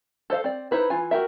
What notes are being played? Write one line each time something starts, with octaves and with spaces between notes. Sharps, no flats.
A4 C5 D#5 F5
C4 D5
D#4 E4 B4 C5
E3 F4 G#5
F#4 G4 A#4 E5